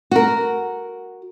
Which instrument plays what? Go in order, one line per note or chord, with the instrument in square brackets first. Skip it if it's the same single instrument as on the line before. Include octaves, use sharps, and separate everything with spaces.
[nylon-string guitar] F#4 A#4